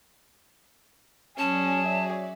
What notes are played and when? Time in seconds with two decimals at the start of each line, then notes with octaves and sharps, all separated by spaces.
1.39 F#3 C#4 G#4 C#5 D5 A5
1.87 E5